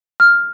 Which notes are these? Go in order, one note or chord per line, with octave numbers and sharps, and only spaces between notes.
F6